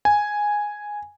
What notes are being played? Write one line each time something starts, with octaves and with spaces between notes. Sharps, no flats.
G#5